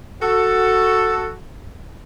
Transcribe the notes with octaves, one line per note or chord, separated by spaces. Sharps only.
F#4 A4